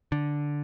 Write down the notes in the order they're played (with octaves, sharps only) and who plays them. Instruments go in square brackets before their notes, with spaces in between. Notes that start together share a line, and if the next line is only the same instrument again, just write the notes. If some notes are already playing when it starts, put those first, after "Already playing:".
[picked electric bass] D3